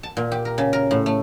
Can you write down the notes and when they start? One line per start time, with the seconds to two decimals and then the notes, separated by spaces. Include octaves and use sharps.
0.03 A5
0.17 A#2
0.32 G4
0.45 A#4
0.58 C#3
0.73 A#4
0.91 A2
1.06 A3